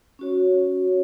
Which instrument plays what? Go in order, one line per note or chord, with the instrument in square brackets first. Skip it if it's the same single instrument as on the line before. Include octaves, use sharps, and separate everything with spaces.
[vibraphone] C#4 F#4 C#5